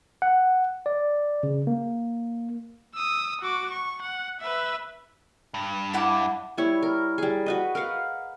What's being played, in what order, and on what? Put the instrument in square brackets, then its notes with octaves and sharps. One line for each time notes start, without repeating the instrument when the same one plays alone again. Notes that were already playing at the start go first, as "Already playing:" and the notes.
[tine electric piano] F#5
D5
C#3
A#3
[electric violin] D#6 E6
F#4 D6
C#6
F#5
B4 E5
[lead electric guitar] G2
[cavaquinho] E4 F#5 D6
[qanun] G3 E4 C#5
A#4
G3 G#4
F#4 B4 D#5
A#4 B4 F5 F#5